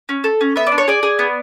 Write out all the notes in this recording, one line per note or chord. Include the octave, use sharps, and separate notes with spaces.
C#4
A4
C#4
B3 E5
D5
D4
C#5
G#4 D5
G#4
B3